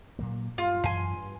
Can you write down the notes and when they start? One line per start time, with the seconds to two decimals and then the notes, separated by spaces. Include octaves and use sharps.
0.19 A#2 F#3 A#3
0.58 G2 F4
0.84 F#2 E3 G#5 C6
1.13 G2